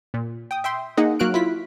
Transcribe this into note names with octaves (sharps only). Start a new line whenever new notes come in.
A#2
G5 D#6
E5 G5 C6
A#3 D#4 G#4 D#5 F#5
F#3 A#3 F#4 F6 F#6 D7
E4 F4 B6